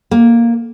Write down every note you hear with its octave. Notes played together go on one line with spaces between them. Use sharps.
A#3